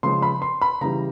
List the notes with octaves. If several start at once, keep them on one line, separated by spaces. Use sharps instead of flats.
C#3 F3 G#3 C#4 C6
B5
C6
B5
C#3 E3 G3 A#5